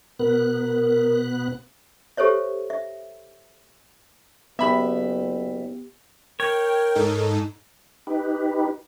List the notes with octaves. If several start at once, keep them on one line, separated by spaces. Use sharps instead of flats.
B2 B3 A#4 F#6
G4 A4 C5 C#5 E5
E5
F#1 B3 G4 E5 B5
A#4 C#5 G5
G#2 D#4 A4
D#4 G4 B4